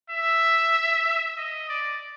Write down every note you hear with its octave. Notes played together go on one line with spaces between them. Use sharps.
E5
D#5
D5